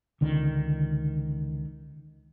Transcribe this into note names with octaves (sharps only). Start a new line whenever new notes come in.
C#2 D3 D#3